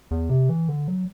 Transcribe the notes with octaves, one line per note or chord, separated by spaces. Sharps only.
E2
C3
E3
D3
F#3